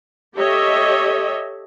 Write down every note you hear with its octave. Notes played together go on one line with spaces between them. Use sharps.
G4 A4 C#5 D#5 E5